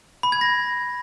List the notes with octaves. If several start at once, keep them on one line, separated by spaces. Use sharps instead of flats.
B5
G#6
A#6